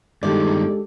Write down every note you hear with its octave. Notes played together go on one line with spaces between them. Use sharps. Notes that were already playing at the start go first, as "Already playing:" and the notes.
G2 D#3 G#3 D4 G4 A4 D5